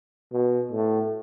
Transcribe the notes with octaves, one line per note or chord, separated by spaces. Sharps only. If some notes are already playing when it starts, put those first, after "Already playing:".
B2
A2